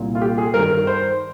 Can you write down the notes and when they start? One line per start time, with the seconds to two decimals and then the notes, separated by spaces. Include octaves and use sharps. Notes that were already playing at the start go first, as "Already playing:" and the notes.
Already playing: C2 A#2
0.15 F4
0.21 G4
0.38 G#4
0.54 G2 D#3 A#4
0.70 A#4
0.87 C5